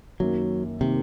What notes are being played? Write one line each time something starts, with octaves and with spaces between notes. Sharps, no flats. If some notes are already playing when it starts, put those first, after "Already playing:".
F#2 D#3 F#3 A#3
C3 D#3 A#3